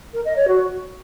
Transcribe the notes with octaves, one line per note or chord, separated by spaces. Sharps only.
A#4
D#5
C#5
F#4